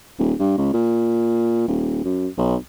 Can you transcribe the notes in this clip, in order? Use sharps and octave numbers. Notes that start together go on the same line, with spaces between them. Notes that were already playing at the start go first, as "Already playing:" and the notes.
D#1
G2
C#2
A#2
D#1
F#2
B1